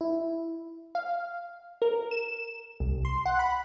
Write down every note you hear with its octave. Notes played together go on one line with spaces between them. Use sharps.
E4
F5
A#4
E7
C2
C6
F#5
B5